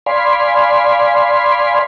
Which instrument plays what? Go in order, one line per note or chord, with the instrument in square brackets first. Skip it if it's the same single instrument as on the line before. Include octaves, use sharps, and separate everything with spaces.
[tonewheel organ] D5 F5 G#5 B5 C6